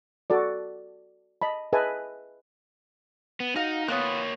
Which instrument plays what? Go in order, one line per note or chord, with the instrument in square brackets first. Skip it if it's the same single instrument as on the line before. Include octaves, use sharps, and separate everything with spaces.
[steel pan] F#4 A4 D5
D#5 A5 B5
G#4 B4 D#5 E5 G#5 A5
[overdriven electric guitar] B3
[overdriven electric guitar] D#4 [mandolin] F#4 F5
[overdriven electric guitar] A#3 C#5 [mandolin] B3 F4 F#6